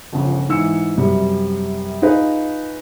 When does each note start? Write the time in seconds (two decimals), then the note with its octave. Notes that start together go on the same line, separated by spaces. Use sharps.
0.13 G1 C#3 F3
0.49 G#2 E3 E6 C#7
0.97 F#2 C3 G3
2.02 D#4 F4 G#4 B4